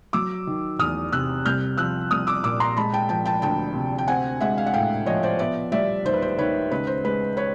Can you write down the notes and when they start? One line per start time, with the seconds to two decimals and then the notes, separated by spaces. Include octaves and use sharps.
0.13 F#3 D6 E6
0.47 D#3
0.79 E2 D#6 F6
1.12 C3 E6 F#6
1.45 C2 F6 G6
1.77 F3 E6 F#6
2.11 C2 D#6 F6
2.27 D6 E6
2.43 A#2 D6 E6
2.60 A#5 C6
2.77 G#3 A5 B5
2.93 G5 A5
3.09 F3 G5 A5
3.25 G5 A5
3.42 D2 G5 A5
3.75 C3
3.98 G5
4.08 C4 F#5 G#5
4.40 G#3 E5 F#5
4.58 F5
4.66 F#5
4.74 A2 F5 G5
5.06 F3 C#5 D#5
5.23 C5 D5
5.39 B3 D5 E5
5.72 G3 D5 E5
6.05 D#2 C5
6.13 B4
6.22 C5
6.38 D#3 B4 C#5
6.71 C#2 B4
6.87 C5
7.05 G#3 B4
7.37 B4 C#5